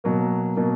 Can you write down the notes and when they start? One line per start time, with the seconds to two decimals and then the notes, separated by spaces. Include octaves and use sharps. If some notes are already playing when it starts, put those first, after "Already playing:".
0.04 B2 F#3 A#3
0.56 B2 F#3 A#3